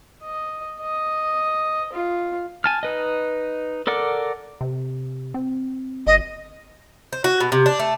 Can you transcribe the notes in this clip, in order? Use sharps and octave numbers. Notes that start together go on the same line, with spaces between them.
D#5
D#5
F4
G#5 A5 F6
D#4 B4 D#5
A4 A#4 D5 F#5 D6
C3
C4
G1 D#5
C5
F#4
B2
C3
D4
A3